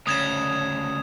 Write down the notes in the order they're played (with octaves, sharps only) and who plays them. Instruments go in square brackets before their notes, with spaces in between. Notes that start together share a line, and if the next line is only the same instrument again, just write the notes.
[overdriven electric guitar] D2 C#3 [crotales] D#6 G#6 E7